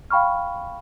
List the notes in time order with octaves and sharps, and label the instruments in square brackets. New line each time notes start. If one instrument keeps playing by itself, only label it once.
[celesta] F5 G5 B5 C#6 F6